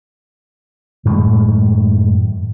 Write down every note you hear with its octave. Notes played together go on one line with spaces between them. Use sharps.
F#2 A2 D#3 G#3